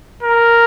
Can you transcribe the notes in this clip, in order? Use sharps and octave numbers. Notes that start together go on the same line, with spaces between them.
A#4